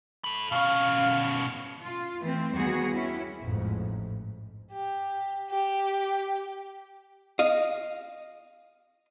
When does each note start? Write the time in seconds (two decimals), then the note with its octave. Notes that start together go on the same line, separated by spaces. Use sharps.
0.24 A4 B5
0.52 B2 C#4 F5
1.83 F4
2.23 E3 A3 C4
2.54 D#2 G3 B3 F#4 G#4
2.91 C#4 E4
3.42 A1 F2 G#2
4.72 G4
5.50 G4
7.39 D#5 F5